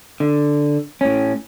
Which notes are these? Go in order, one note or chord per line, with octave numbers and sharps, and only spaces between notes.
D3
A2 C#4